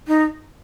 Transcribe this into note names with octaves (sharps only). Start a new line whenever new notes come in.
D#4